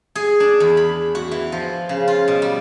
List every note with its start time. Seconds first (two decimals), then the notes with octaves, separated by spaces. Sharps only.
0.15 G#4
0.40 D4
0.60 E2
0.77 B5
1.15 F#4
1.32 E3
1.52 F3
1.89 C#3
2.08 F4
2.28 B2
2.42 G3